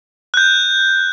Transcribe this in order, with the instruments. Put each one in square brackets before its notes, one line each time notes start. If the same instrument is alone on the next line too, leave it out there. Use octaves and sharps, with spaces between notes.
[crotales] F#6 G6